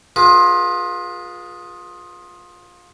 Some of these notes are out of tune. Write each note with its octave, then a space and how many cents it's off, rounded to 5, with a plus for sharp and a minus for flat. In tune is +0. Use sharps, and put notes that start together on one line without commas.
F4 +20 G#4 +0 B4 -40